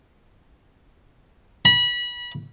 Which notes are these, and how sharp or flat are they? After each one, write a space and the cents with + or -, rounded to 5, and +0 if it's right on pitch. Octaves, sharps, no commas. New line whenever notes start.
B5 -30